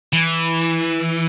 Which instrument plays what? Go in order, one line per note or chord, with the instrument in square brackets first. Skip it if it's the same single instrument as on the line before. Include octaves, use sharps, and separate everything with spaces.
[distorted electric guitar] E3